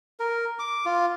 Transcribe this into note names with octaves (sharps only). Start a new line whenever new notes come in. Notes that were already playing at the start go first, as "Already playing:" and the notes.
A#4
D6
F4